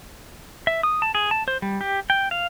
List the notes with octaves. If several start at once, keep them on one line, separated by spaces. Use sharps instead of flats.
E5
D#6
A5
G#4
A5
C5
G3
G4
G5
F5